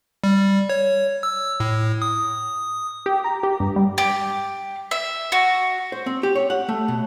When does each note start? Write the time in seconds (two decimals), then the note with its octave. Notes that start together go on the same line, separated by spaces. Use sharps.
0.24 G3
0.70 C#5
1.23 E6
1.60 A2
2.02 D#6
3.06 G4
3.24 A#5
3.43 G4
3.60 G2
3.76 G3
3.98 G4
4.91 E5
5.32 F#4
5.92 C5
6.06 C4
6.23 G4
6.35 C#5
6.50 F#5
6.69 A3
6.88 B2